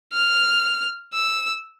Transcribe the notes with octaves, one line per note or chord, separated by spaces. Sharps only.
F6
E6